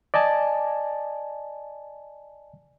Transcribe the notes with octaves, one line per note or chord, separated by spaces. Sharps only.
D5 D#5 G#5 A5